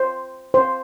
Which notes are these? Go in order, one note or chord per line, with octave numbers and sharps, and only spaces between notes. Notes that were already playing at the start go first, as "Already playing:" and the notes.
Already playing: C5
C5